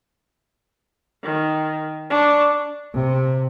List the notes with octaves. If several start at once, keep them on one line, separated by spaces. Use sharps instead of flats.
D#3
D4 C#6
C3